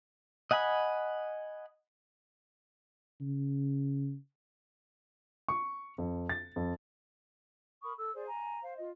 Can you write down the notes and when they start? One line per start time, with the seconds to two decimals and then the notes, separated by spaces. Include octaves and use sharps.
0.51 D#5 F#5 G#5 B5
3.21 C#3
5.48 C#6
5.98 F2
6.29 A6
6.56 F2
7.83 A#4 B5 C#6 D#6
7.97 A4 E6
8.15 G#4 C5 D5
8.28 G#5 A#5
8.62 C5 F5
8.77 F4 D#5